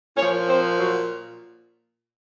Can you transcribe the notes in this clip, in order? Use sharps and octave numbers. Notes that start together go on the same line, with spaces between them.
A#2 F3 C#4 C#5
C4 C5
F#3 F#4